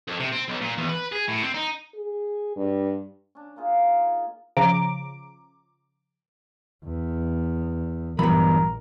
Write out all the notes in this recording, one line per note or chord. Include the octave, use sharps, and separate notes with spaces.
F2
C3
C4
B1
A#2
E2
B4
G#4
A2
C4
D#4
G#4
G2
C#4 D4
A#3 D#4 F4 G#4
C6
C#3 F3 A#5 D6
E2
A#1 G2 E3 F#3 B3 A#4 B5